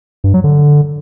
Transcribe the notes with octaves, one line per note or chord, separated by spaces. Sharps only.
G2
F#3
D3